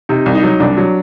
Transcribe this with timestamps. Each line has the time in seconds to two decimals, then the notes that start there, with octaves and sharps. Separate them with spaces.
0.09 C3 D#4
0.26 C2
0.35 D#4
0.43 F#3
0.60 C2 D4
0.77 F#3